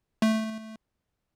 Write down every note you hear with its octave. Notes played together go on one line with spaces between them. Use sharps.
A3